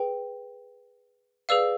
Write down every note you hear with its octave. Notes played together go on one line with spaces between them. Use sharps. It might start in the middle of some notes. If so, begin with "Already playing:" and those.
Already playing: G#4 B4 G5
G#4 B4 D5 F5 E6